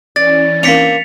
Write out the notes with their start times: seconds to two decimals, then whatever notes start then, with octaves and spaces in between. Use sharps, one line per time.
0.16 E3 C#4 D5 A6
0.63 A#3 C4 D4 B6 C#7 F7